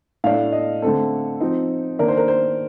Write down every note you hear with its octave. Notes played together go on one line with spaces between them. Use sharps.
A2 A3 D4 F5
D#5
D3 A3 C4 A4
F3 C4 D#4
D#3 A#3 D4 A#4
C5
A#4
C5